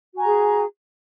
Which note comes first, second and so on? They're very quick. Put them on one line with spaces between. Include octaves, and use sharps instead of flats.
F#4 G#5 A#5 G#4